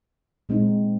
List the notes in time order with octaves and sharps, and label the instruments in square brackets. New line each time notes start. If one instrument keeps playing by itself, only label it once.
[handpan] A#2 G#3 C4 D#4